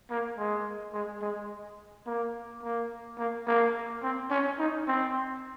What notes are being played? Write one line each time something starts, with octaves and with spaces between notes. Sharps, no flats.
A#3
G#3
G#3
G#3
A#3
A#3
A#3
A#3
C4
C#4
D#4
C4